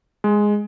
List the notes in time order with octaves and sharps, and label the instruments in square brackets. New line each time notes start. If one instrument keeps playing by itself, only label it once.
[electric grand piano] G#3